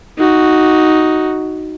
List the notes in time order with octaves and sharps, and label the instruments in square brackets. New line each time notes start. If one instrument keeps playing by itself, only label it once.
[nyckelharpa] D#4 F#4